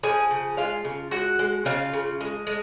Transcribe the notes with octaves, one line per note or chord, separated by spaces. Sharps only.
F3 G#4 G#5
C#3
G#3 F4 F5
C#3
G#3 F#4 F#5
G#3
C#3 F4 F5
C#3
G#3
G#3